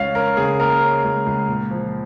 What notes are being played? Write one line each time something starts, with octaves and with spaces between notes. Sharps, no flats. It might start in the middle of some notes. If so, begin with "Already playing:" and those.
Already playing: C#2 C#4 F5
C#4 A#4
C#3 G#4
A#3 A#4
C#4
C#2
C#2
A#2
F3